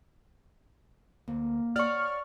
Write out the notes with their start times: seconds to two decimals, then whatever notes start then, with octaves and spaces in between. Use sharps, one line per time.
1.28 D2 A#3
1.76 C#5 D5 F#5 C#6 F6